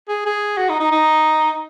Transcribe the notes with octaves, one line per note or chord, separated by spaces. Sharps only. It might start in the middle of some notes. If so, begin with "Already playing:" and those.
G#4
G#4
F#4
D#4
D#4
D#4